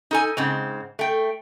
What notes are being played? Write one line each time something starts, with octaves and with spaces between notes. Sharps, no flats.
D#4 A4 G#5
G#2 C#3 C4
A3 G5